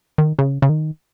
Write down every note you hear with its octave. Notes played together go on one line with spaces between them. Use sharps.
D#3
C#3
C#3
D#3